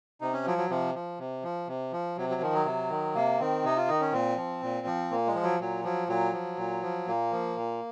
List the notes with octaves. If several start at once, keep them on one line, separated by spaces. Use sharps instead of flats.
C3 D#4
C#4
F3 F#3
F#3
C3 F3
F3
C3
F3
C3
F3
C3 F#3
F#3
D#3 F3
F#3
C3
D#3
C3 A#3
D#3 C4
C3 D#4
F4
D#3 D#4
C#4
A#2 C4
F3
A#2
F3
A#2 A#3
G#3
F3
F#3
A#2 F#3
F3 F#3
A#2 F#3
F3
A#2
F3
A#2 A#3
F3
A#2